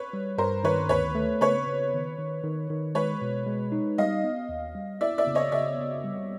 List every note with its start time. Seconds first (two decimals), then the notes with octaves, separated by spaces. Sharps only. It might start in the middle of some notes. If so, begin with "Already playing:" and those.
Already playing: B4 C#5
0.13 G3
0.38 G2 A#4 C5
0.64 D#3 B4 C#5
0.89 D2 B4 C#5
1.15 A3
1.41 C#3 B4 C#5
1.66 C#3
1.93 D#3
2.19 D#3
2.43 D#3
2.70 D#3
2.95 G#3 B4 C#5
3.21 B2
3.46 G#3
3.72 D#4
3.98 G3 D#5 F5
4.24 B3
4.49 D#2
4.75 G3
5.01 E4 D5 E5
5.18 D5 E5
5.27 C#3
5.35 C#5 D#5
5.52 C#3 D5 E5
5.78 C#3
6.04 G3